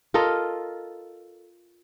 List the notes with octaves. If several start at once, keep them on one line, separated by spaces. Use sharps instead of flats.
F4 A4 A#4 D#5